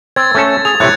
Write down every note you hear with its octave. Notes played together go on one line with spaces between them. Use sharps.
C4 G#6 A6
A3 C#4 A4
G#4 F7
A2 C3 A3 F#6 G#6 C#7